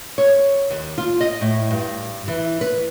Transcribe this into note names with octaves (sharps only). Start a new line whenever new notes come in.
C#5
D#2
F4
D#5
A2
G2
E3
B4